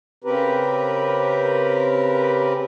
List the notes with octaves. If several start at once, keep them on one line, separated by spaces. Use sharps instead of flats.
C#3 C4 G4 A#4 B4